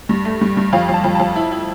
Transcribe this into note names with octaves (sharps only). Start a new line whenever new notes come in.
G2
A3
G2
G2
F2 F5
F2 A5
F2
F2 A5
E4
E4